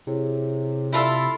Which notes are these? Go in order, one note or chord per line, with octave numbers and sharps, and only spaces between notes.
C3 E4 G#4 C#5
E4 F4 A4